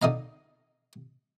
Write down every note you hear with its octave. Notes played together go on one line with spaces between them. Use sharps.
D3 D#4 D#5 F5 A#5